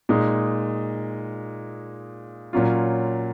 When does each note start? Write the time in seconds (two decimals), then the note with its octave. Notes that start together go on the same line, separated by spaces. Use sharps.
0.09 A#2 G#3 D#4
2.53 A#2 F#3 C#4 F4